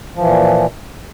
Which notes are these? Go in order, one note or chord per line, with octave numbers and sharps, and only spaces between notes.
A#2 E3 F3